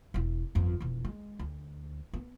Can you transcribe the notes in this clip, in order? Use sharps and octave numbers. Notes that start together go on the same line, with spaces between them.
E1 E4
G1 F2
E1 F2
G#3
D2
B3